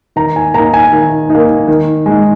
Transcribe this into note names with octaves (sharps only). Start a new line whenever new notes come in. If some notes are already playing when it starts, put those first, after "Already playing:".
D#3 A#5
G#5
A#3 D#4 A#5
G#5
D#3
A#3 D#4
D#3
G#3 D#4